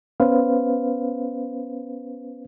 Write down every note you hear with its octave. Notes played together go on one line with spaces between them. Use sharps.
B3 C#4 B4 C5 F5